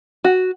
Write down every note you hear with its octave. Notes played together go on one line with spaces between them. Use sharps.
F#4